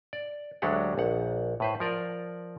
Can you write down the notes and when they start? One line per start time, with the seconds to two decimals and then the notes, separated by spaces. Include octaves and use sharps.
0.13 D5
0.62 D2 F#3 G#3 D4 G4 F#5
0.98 A#1 F#5
1.60 A2 B4 C5
1.80 F3 A#4 D5